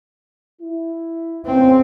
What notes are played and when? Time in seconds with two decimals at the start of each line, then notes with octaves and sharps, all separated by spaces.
0.62 E4
1.46 C#2 C#3 C4